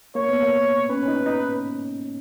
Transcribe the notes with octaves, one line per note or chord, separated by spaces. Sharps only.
A#3 C#5
B3
A#3
C#4 B4
C#4
D#4
D#4